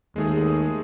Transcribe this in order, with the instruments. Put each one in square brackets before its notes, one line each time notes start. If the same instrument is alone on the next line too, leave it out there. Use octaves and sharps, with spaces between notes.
[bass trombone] D#2 [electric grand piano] G#3 A3 G#4